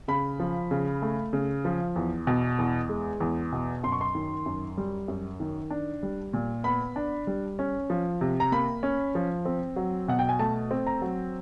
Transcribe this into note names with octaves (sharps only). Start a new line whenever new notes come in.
C#3 B5
F3
C#3
A3
C#3
F3
E2
B2
E2
G#3
E2
B2
F#2 C6
C#6
C6
D#3
F#2
G3
F#2
D#3
D4
G3
A#2
B3 B5
D4
G3
C#4
F3
C3
A#5
A#3 B5
C#4
F3
C4
F#3
B2 F#5
G5
G#5
A3 A5
C4
A#5
F#3